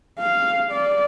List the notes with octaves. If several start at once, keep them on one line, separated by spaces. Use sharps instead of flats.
F5
D5